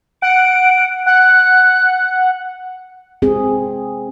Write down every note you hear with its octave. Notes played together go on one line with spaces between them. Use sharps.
F#5 D7
F#5 F#6
C4 G#4